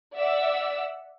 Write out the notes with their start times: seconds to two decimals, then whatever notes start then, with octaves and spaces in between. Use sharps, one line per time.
0.16 D5 E5 F#5 E6